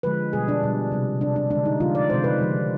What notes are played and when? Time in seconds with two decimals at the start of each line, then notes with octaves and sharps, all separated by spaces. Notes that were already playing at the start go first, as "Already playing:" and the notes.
0.03 D3 F3 G#3 B4
0.33 B2 G3 G#4
0.48 D4
0.63 B2 G3
0.92 C3 G3
1.21 C3 G3 D4
1.36 D4
1.50 G#3 D4
1.55 D3
1.65 D#4
1.80 D3 F3 G#3 F4
1.95 D5
2.10 C3 D#3 G#3 C5
2.24 B4
2.39 D3 F3 G#3